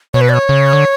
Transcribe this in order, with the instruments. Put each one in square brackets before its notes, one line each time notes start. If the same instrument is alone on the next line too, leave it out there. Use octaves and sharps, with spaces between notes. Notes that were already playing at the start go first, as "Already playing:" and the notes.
[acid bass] B2 [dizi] C#5
[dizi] B4
D5
C#5
[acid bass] C#3
D3